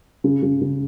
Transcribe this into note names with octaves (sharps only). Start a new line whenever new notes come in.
C#3
C#3
C#3